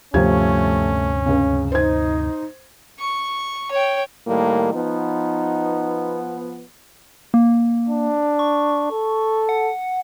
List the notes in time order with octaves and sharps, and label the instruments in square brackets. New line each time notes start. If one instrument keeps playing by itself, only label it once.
[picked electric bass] D2 G2 C3 [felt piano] F3 G4 G#6 [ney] A3 [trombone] C#4
[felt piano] C#2 C#3
[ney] D#4 [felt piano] C5 G#6
[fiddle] C#6
C#5 G5
[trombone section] A2 D#3 G3 [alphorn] A#3
[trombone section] F3 B3 [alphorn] D#4
[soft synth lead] A#3
[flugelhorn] D4
[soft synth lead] C#6
[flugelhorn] A4
[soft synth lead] F#5